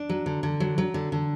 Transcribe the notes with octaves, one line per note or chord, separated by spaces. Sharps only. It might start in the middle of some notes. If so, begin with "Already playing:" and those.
Already playing: D4
F#3
D3
D3
F#3
F#3
D3
D3